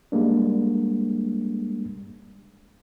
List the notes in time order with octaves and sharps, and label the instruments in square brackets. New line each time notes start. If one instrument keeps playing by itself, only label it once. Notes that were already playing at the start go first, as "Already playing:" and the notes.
[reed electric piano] G3 G#3 A#3 D4